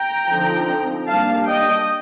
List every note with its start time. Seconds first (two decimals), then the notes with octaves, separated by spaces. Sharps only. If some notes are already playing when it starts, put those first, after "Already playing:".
Already playing: G5 A#5
0.29 D3 F3 C4 D#4
1.08 G3 A#3 D4 F5 A5
1.48 D#5 G5